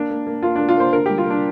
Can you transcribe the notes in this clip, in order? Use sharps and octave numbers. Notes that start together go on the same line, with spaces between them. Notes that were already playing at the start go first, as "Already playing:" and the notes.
Already playing: A#3 D4
A#3
A#3
A#3 F4
A#3 D4
F4
A#3 C5
D3 A#4
G3 G4
F4
A#3 D4